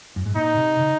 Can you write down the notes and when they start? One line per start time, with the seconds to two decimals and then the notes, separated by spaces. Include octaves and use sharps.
0.16 F#2
0.25 G#2
0.35 A#2 D#4
0.57 C3
0.79 C#3